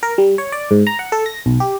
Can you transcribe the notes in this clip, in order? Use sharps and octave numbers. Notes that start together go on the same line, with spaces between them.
A#4
G3
C#5
D5
G#2
A#5
F#5
A4
A#6
B1
G4